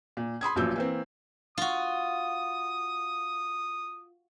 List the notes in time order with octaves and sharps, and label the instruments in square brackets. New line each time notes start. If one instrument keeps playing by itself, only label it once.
[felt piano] A#2
B5 C6 D#6 G#6
A1 A#2 F3 F#3 E6 G6
E3 A#3 C4
[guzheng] F4 F#4 [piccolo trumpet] D#6